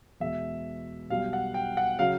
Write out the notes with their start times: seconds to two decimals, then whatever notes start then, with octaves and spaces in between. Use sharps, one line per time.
0.20 E2 B2 G#3 E5
1.10 B1 B2 G3 F5
1.33 F#5
1.54 G5
1.77 F#5
1.99 C#3 F#3 F5